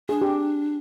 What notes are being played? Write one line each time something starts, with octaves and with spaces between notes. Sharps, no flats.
D4 G#4
G4